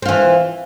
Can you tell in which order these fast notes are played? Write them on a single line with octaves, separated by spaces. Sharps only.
C4 F4 E3